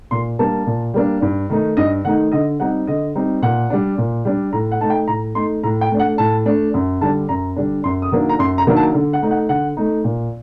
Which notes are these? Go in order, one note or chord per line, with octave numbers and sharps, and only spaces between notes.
A#2 C6
G3 A#3 D4 A5
A#2
G3 A#3 D4
G2
D#3 A3 D#4
G2 D#5
D#3 A3 D#4 F#5
D3 D#5
G3 C4 D#4 F#5
D3 D#5
G3 C4 D#4
A#2 F#5
G3 D4
A#2
G3 D4
A2 A#5
F#5
A3 D#4 A5
G5
A2 A#5
A3 D#4 C6
A2 A#5
G5
A3 D4
F#5
A2 A5
A3 D4
F#2
D3 G3 D4 A5
F#2 A#5
D3 G3 D4
F#2 C6
D#6
D#3 F#3 A#3 D4
A#5
F#2 C6
A#5
D#3 F#3 A#3 D4
A5
D3
F#5
A3 D#4
F#5
D3 F#5
A3 D#4
A#2